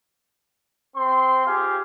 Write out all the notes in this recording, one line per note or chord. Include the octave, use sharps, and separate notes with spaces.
C4 C6
F4 G4 G#4 F5